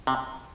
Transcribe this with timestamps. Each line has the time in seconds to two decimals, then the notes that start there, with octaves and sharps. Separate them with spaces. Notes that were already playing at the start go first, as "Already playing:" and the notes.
0.07 C3